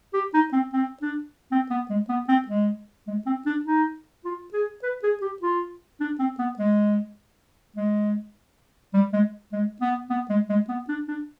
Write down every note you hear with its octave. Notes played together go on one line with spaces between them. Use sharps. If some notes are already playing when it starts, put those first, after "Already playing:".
G4
D#4
C4
C4
D4
C4
B3
G#3
B3
C4
G#3
G#3
C4
D4
D#4
F4
G#4
B4
G#4
G4
F4
D4
C4
B3
G#3
G#3
G3
G#3
G#3
B3
B3
G#3
G#3
B3
D4
D4